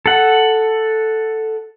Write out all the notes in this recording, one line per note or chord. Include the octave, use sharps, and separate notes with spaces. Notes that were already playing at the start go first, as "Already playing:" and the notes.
A4 F#5